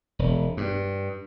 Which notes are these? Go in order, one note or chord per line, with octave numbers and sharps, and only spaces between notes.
E1
G2